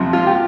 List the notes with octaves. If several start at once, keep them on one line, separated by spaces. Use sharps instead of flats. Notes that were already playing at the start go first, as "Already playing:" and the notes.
Already playing: F2 C3 F3
F4
G4